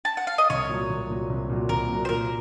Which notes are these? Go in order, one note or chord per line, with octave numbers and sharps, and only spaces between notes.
A5
F#5
F5
D#5
C2 C#5
A#2 F#3
C2
A#2 F#3
C2
A#2 F#3
C2 A#4
A#2 F#3
C5
A#2 A#4